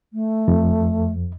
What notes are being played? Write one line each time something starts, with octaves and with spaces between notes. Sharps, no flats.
A3
F2